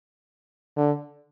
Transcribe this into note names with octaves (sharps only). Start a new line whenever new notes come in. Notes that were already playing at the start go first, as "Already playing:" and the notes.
D3